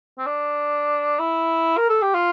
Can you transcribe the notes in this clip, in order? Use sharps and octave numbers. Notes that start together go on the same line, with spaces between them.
C4
D4
E4
A#4
A4
G4
F4